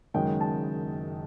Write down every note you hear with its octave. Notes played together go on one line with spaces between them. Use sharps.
F#1 F#2 D#3 G#3 G5
A5